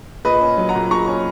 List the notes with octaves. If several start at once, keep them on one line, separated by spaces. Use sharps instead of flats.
A#2 B4 D#5
C#4
F#3
F#5 A#5
A#2
A#2 A#5 C#6
C#4